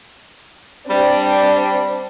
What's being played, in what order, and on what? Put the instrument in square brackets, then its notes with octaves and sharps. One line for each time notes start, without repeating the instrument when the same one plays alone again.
[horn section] G3 [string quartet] C4 D4